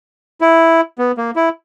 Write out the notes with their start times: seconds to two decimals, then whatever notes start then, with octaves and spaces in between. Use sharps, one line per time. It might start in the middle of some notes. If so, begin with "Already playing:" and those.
0.41 E4
0.98 B3
1.18 A#3
1.36 E4